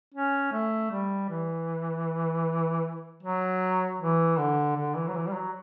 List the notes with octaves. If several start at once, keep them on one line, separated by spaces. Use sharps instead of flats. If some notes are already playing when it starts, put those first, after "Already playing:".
C#4
A3
G3
E3
F#3
E3
D3
D3
E3
F#3
E3
G3
F#3